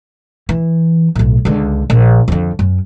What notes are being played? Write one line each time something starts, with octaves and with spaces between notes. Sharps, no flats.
E3
B1 A2
C#2 D3
A#1
F2 D3
F#2